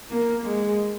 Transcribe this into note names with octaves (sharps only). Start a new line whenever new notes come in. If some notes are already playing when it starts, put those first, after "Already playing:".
A#3
G#3